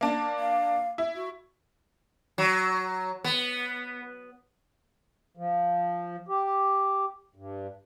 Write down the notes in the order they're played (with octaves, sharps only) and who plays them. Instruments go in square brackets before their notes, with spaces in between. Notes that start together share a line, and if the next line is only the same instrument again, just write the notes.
[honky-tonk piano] A#3 D4
[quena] F5
[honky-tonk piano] E4
[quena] F#4
[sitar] F#3
B3
[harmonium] F3
G4
G2